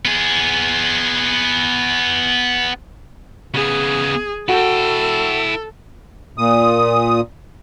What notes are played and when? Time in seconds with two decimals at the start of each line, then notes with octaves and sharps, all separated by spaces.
0.05 B3 G#4
3.54 C#3 B3 G#4
4.49 E4 F#4 A4 G5
6.38 A#2 D#6